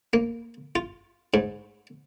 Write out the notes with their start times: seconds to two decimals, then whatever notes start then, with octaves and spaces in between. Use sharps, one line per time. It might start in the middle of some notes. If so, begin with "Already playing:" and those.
0.13 A#3
0.75 F4
1.34 G#2